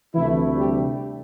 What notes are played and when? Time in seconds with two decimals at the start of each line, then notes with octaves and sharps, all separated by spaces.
0.15 D2 C3 E3 A3 E4
0.56 G3 G4